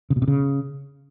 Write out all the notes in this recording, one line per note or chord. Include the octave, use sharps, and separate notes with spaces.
C#3
B2
C3
C#3